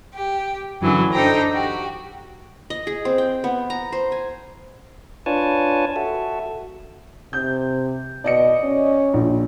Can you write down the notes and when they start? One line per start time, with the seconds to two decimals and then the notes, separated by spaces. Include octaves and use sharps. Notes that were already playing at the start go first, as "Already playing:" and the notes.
0.14 G4
0.81 F#2 D3 E3 F#3 C#4
1.12 D4 D#4 A4 C5 G5 A#5
1.53 F#4 G4
2.70 D#5
2.87 G#4
3.05 C4
3.18 G5
3.44 B3
3.70 A#5
3.92 C5
4.12 G#5
5.26 D4 F4 B4 C#5 G#5 A5
5.96 F#4 A4 E5
7.33 C3 G6
8.24 B2 D5 D#5 C#7
8.63 C#4
9.14 A#1